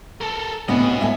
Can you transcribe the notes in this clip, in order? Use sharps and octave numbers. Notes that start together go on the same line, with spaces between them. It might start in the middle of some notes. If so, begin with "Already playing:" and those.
A4 A#4
D2 A2 C3 B3 G4 D5 D#5 F#5
A2 A3 E5 G#5